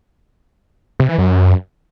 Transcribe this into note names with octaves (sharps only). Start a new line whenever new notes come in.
C3
E3
F#2